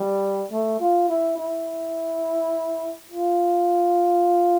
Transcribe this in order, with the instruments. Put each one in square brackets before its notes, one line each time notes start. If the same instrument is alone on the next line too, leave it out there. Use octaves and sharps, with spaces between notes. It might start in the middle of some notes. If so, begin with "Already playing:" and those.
Already playing: [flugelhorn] G3
A3
F4
E4
E4
F4